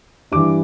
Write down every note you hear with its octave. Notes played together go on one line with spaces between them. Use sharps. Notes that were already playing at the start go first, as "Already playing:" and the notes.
G2 E3 G3 D4 D6